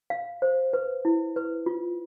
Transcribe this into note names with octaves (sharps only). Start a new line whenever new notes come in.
F5
C5
B4
E4
B4
F4